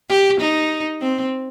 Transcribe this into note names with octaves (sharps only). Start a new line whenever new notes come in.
G4
D#4
C4